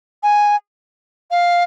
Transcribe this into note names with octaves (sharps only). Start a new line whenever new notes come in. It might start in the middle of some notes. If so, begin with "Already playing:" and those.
G#5
F5